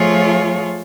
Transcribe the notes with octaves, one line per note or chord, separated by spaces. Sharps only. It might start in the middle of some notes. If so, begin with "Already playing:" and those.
Already playing: F3 A3 F4 G#4 C#5